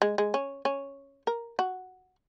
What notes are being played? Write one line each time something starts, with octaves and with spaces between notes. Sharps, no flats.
G#3
G#3
C#4
C#4
A#4
F#4